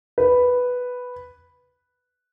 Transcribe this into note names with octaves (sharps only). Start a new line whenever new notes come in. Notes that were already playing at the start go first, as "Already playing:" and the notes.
B4